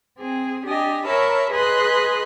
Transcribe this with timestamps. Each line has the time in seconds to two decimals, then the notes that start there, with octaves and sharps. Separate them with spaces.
0.18 C4 G#4
0.65 D4 G4 D#5 G#5
1.05 A#4 C#5 E5 A5 B5
1.50 G#4 B4 D#5 C6 F#6